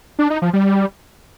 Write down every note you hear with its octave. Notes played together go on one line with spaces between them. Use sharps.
D4
D#4
F3
G3